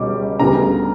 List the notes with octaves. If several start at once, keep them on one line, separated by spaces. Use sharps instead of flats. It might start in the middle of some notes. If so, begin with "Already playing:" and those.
Already playing: C#2 B2 G3 C#4 D6
D2 C#3 G3 B3 D4 A#5